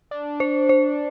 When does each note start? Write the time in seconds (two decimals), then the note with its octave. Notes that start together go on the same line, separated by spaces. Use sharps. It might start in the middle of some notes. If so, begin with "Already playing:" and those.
0.11 D4
0.40 C5
0.69 C5